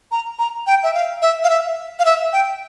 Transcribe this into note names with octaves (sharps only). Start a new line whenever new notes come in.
A#5
A#5
G5
E5
F5
E5
F5
E5
F5
E5
G5